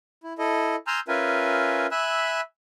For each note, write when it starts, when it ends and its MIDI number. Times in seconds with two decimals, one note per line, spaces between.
0.24 0.33 64
0.38 0.76 64
0.38 0.76 69
0.38 0.76 75
0.87 1.00 80
0.87 1.00 82
0.87 1.00 84
0.87 1.00 88
0.87 1.00 89
0.87 1.00 91
1.08 1.87 61
1.08 1.87 65
1.08 1.87 70
1.08 1.87 71
1.08 1.87 76
1.08 1.87 80
1.91 2.41 76
1.91 2.41 80
1.91 2.41 83
1.91 2.41 88
1.91 2.41 90